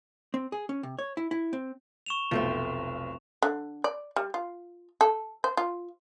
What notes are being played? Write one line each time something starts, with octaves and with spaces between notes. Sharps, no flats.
C4
G#4
C#4
C3
C#5
E4
E4
C4
C#6 E7 F7
F1 B1 F3 A3 C4
D3
D5
G3
F4
A4
C5
F4